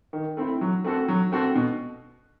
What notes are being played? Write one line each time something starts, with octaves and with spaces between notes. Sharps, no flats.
D#3
A3 C4 E4
F#3
A3 C4 F#4 A4
F#3
A3 C4 F#4 A4
B2